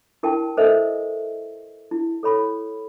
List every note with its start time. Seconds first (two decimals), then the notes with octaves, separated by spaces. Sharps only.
0.23 E4 A#4 G5 A5
0.57 A4 A#4 C5 D#5 E5
1.91 E4
2.23 A4 C#5 B5